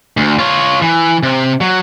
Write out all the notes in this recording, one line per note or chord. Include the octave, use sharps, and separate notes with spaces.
D2
F4 C#5
E3
C3
F#3